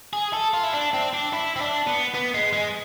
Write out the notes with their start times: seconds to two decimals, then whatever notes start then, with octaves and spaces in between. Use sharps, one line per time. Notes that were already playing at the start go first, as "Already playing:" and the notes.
0.13 G#4
0.33 A4
0.54 F4
0.64 E4
0.74 D4
0.94 C4
1.13 D4
1.33 E4
1.56 C4
1.61 D4
1.87 B3
2.14 B3
2.34 G#3
2.53 G#3